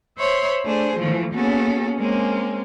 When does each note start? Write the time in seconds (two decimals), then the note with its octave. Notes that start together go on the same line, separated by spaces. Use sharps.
0.19 C5 C#5 E5 B5 C6
0.65 A3 D4 G#4 C5
0.98 E3 F3 A3
1.34 A#3 B3 C#4 F#4 G#4 A4
1.99 G#3 A#3 C4 C#4